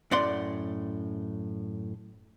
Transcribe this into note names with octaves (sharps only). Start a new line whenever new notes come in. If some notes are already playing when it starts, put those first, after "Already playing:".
F#2 A2 D5 F#5 C6